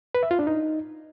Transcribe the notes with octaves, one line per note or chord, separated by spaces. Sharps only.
B4
E5
F4
D4
D#4